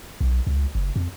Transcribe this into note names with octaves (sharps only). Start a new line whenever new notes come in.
B1
C#2
F#1
F2